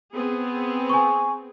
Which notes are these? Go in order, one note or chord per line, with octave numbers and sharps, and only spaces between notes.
B3 C4 G#4
G#5 C#6